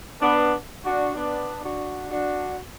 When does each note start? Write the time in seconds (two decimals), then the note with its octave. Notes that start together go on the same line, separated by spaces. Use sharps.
0.21 B3 D4
0.85 D4 F#4
1.15 B3 D4
1.64 D4 F#4
2.10 D4 F#4